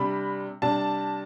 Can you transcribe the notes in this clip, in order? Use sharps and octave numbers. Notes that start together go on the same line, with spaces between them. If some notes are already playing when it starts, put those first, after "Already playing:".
Already playing: C3 G3 D4 B5
C3 G3 D4 A5